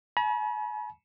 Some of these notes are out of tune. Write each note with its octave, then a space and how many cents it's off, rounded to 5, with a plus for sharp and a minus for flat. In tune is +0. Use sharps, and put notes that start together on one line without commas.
G#5 +45 B5 -45